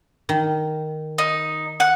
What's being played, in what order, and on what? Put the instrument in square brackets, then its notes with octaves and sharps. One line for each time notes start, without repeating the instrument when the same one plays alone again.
[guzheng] D#3
[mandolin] D#4
F#5